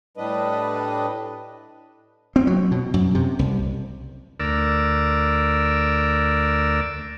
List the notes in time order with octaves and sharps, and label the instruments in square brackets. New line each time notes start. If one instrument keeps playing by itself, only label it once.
[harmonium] A2 G3 D4 B4 D#5
[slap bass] C4
F#3
B2
F#2
C3
C2
[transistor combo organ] D2 A#4 D5 E6